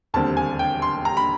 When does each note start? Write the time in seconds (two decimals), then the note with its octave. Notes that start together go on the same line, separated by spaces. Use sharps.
0.14 E1 D#2 D3 G3 C4 A5
0.37 G#5
0.59 G5
0.82 C6
1.05 A#5
1.17 B5